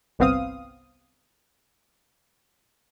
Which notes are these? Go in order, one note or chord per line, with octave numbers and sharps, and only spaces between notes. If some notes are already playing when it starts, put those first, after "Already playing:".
G1 C2 B3 C4 F5 D#6